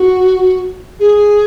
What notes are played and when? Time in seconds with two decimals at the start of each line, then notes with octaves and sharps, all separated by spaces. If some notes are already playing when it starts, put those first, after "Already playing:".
Already playing: F#4
0.99 G#4